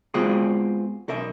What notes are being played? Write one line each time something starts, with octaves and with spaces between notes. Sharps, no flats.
G#3 B3 C4 F4 F#4 G#4
B1 A#4 E5